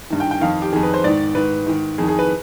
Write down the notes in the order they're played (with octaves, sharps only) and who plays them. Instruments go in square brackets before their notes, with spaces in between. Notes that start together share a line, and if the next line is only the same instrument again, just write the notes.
[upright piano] G2 D#3
G5
G5
F2 D#3 F5
G4
F2 D#3 G#4
B4
C5
G#2 D#3 D5
G#2 D#3 B4
G#2 D#3
F2 D#3 G#4
G#4
B4